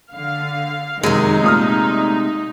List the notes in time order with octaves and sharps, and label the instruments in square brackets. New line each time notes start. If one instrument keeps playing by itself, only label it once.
[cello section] D3 [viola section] F5
[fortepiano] F#2 [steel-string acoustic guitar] C3 G#3 [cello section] D#3 [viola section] D#4
[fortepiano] A#2 D#6 F6 [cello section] A3